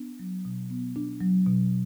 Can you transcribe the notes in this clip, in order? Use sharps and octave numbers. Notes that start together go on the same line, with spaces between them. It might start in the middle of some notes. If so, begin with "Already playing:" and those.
Already playing: B3 D4
F#3
B2
B3
D4
F#3
B2